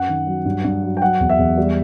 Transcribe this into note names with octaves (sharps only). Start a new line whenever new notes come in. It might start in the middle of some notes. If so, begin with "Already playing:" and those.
Already playing: F#2 F#5
D#3
F#3
G2
G2
F#3
G5
F#3 F#5
E2
E5
E2
G3